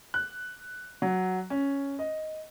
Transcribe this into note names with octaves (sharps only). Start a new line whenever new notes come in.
F#6
F#3
C#4
D#5